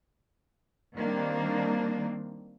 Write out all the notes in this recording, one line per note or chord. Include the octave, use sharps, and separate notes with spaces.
D#3 G3 A#3 C4 D4